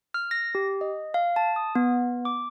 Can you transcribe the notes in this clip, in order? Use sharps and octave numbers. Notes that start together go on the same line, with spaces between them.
F6
A#6
G4
D#5
F5
A5
D#6
B3
D6